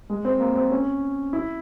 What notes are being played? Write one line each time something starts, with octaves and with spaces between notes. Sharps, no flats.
G#3
C4
A#3
C4
C#4
E4